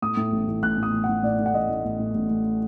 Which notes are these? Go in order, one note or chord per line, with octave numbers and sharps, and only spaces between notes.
A2 D#6
A2
A1
A1
A1 F#6
A2
D#6
A1
F#5
A2
A2 D5
A2
F#5
A1 D#5
A1
A1
A2
A1
A2